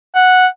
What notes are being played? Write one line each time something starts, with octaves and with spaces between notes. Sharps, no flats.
F#5